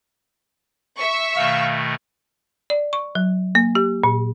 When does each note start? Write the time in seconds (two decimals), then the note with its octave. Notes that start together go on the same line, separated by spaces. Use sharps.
0.99 E5 C#6
1.36 B2 D#3 A3 F5
2.70 D5
2.93 C#6
3.15 F#3
3.55 A#3
3.75 G4
4.04 A#2